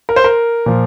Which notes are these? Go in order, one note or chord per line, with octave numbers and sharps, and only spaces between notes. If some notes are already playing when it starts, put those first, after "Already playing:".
A#4
C5
A#4
A#2 F3